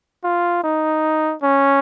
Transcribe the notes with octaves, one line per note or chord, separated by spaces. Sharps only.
F4
D#4
C#4